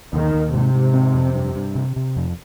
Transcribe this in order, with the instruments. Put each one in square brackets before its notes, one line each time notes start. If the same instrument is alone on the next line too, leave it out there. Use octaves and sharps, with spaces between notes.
[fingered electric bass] D#2 [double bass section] D#3
[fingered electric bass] D#2
[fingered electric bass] G#2 [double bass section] C3
[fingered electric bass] G#2
C4
F2
G2
G2
C3
C3
F2